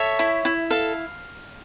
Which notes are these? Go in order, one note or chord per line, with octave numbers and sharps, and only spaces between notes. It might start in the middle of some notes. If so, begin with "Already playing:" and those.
Already playing: A4 C#5 E5
E4
E4
A4 F5